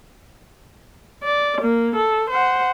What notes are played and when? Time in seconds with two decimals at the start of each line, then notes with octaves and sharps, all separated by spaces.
1.24 D5
1.61 A#3
1.96 A4
2.30 C5 F#5